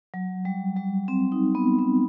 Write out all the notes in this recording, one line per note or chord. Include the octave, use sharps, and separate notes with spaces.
F#3
G3
G3
C4
D#4
B3
C4